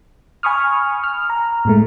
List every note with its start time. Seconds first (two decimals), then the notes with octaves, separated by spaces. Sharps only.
0.43 G#5 B5 C#6 D#6 F6
1.04 F6
1.30 A#5
1.65 A2 G#3 A3